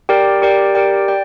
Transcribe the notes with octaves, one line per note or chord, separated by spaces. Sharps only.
G4 A#4 D5 G5
G4 A#4 D5 G5
G4 A#4 D5 G5
D5 G5